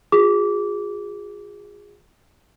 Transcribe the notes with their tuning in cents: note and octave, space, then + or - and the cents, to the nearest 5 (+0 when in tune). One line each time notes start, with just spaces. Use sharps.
F4 +40 G#4 -20 D6 -20